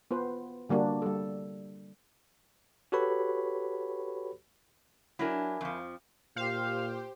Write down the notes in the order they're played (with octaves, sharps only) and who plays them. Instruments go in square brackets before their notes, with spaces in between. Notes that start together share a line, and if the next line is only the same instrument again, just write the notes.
[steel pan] B3 F4 B4 C5
D3 G3 A#3 D4 F#4
G3 A4
[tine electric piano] F#4 G4 A4 B4 C#5 B5
[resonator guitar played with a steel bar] F#3 D4 [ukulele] E4 A#4 G#5
[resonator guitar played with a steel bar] F2 F3
[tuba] A#2 [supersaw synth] G4 C5 [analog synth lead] F5